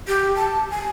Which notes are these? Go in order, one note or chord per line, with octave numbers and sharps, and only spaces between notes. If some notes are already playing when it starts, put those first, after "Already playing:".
G4
A5
G#5